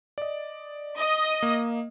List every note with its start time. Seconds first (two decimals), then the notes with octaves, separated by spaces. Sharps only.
0.18 D5 D#5
0.98 D#5
1.42 A#3